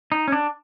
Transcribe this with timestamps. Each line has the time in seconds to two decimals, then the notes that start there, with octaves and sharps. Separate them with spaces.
0.12 D#4
0.28 C#4
0.32 D4